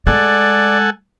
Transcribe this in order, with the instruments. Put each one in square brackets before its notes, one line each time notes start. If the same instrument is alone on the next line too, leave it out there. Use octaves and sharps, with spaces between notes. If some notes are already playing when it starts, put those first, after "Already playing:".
[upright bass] G#3 A3 [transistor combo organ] A4 F#5 G#5 [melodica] D5